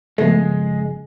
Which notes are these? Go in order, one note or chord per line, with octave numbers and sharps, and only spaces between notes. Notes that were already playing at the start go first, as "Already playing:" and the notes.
G1 C#3 F3 G#3 A3 B3